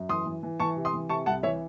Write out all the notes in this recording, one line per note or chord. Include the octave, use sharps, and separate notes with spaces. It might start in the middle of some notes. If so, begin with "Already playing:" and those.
Already playing: F#2
E3 C6 D#6
E3
E3
E3 A5 C#6
C3
C6 D#6
E3
C3 A5 C#6
C2 F#5 A5
E3 C#5 E5